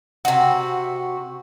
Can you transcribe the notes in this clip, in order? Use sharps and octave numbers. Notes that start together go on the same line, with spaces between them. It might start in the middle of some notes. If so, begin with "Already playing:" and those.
C3 F#4